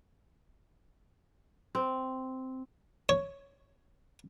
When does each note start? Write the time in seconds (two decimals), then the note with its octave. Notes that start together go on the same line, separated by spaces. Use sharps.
1.75 C4
3.09 C#5